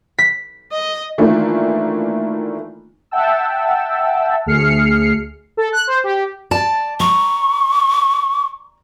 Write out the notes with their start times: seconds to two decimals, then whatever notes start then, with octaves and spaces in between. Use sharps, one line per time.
0.19 B6
0.72 D#5
1.18 D#3 E3 A3 A#3 D4 F4
3.11 E5 F#5 G5 A5 E6
4.46 D2 A3 G#4 F6 C7 C#7
5.57 A4
5.72 F#6
5.87 C5
6.04 G4
6.51 D5 A5
7.00 A#5 C#6